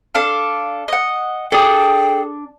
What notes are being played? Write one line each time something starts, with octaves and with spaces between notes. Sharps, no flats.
D4 A4 F5
D#5 F#5
D4 G#4 A4 G5